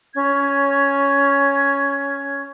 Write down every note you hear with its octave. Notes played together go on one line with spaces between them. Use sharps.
C#4 G#6